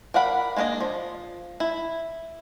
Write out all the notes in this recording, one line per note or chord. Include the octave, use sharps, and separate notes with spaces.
A#4 D5 F5 F#5 B5
G#3 A#3 D4 B4 D#5
F3
E4